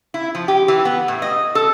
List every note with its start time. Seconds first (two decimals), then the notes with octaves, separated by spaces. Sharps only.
0.14 E4
0.35 F3
0.48 G4
0.68 E3
0.85 B3
1.08 A2
1.22 D#5
1.55 A4